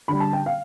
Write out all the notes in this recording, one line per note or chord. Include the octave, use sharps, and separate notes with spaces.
D3 G3 B5
A5
G5
F5